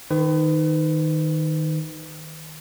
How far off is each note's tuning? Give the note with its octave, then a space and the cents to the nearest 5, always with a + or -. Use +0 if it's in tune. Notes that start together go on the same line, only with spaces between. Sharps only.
D#3 +0 B4 +35